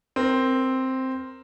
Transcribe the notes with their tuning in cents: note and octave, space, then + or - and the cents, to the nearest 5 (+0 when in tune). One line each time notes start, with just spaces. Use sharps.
C4 +0 A#4 +0